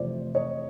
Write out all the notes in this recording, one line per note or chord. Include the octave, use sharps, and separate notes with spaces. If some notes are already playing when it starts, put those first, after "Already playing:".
Already playing: F2 C3 E3 A3 C5 D5
C#5 D#5